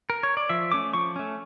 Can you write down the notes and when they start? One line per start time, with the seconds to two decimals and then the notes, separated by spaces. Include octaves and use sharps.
0.10 A#4
0.23 C#5
0.37 D5
0.49 F3 E5
0.72 A3 C#4 D6
0.94 F3 C#6
1.16 A3 C#4